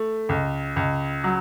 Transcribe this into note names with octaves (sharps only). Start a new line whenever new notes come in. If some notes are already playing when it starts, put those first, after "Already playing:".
Already playing: A3
C#2
C#2
F#3